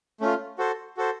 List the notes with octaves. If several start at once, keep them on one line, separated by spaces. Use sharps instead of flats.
A3 C#4 F4
F#4 A4 C5
F#4 A4 C5